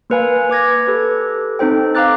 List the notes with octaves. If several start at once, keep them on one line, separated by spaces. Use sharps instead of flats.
A#3 A#4 B4 F5 G#5
B4 D6 G#6 A#6
G4 A4 B4
C4 D#4 A4 C5 G5
F5 G5 A#5 D6 F#6 A6